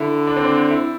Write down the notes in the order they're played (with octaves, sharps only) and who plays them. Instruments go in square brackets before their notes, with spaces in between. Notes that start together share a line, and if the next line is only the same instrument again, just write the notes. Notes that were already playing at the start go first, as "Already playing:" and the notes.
Already playing: [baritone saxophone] D3 [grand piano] E4
[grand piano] D4
C4
D4
E4